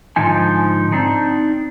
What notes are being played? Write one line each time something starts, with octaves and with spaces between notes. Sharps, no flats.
G#2 D3 F3 D#4 G#5
C4 D4 D#4